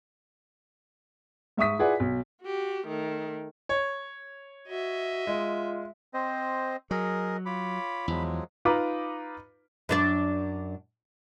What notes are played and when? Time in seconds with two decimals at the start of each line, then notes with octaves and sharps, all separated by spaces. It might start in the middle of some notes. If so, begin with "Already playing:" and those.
1.57 G#2 E5 C#6 D#6 B6
1.79 E4 F4 G#4 B4 D5 F#5
2.00 B1
2.42 F#4 G4
2.87 D#3 A3
3.69 C#5
4.68 F#4 D#5 E5
5.27 G#3 F4
6.14 C4 C5 D#5
6.91 F#3 G#4 A#4 D#5
7.46 F4 C#5 B5 D6
8.08 E2 F3 F#3 G#3
8.65 D#4 F4 B4 A#5 B5 D6
9.89 F#2 D4 D5